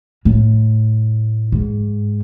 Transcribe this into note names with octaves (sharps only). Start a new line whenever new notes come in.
A2
G#2